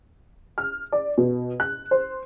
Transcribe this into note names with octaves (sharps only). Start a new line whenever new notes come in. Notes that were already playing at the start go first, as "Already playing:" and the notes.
F6
D5
B2
F#6
C5